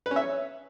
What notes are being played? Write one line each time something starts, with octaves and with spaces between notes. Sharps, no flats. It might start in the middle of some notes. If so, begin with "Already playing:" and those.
B4
C#4
E5
C#5